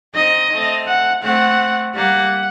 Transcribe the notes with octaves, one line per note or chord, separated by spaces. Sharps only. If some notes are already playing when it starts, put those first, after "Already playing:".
C4 D#4 D#5
A3 C4
F#5
A3 C4 F#5
G3 A#3 F#5